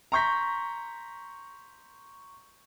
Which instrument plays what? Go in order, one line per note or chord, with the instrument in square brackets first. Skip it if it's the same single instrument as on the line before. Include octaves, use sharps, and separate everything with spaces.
[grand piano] A#5 C6 C#6 G6 A#6 B6